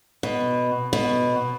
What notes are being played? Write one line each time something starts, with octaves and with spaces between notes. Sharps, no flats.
B2
B2